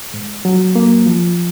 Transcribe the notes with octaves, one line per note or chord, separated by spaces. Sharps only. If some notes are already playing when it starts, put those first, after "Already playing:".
G#2
F#3
A#3
F3